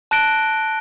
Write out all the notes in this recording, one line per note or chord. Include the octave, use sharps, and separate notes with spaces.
A5 F#6 A#6 D7 G7